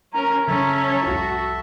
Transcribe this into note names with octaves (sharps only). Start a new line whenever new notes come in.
C#4 A#4 A#5
C#3 F#3 C#4 A4 C#5 E5
C2 F2 F#4